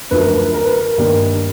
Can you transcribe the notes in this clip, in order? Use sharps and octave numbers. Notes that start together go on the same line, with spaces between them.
F#2 D3 F3 A3 B4
A#4
B4
A#4
B4
A#4
G2 D#3 G3 A#3 A#4